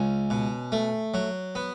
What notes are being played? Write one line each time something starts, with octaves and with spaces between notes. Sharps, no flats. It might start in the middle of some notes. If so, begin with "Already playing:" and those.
Already playing: C#2 C#4
B2
A3
F#3
B3